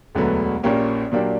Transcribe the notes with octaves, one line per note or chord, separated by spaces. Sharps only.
E1 D2 D3 F#3 B3
A#1 A#2 A#3 C#4 G4
A#2 F#3 A#3 D4 G4